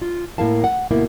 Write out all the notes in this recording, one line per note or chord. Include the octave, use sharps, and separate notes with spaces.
F4
A2 A#3 E4 A#4 F5 A5
F#5
D2 B2 A#3 E4